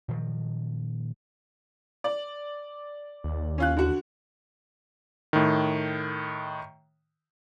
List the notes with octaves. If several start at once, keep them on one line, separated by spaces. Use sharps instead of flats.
A#2 D#3 F3 F#3
D5
D#2
C#4 F4 F#6
D3 F#4
A2 D#3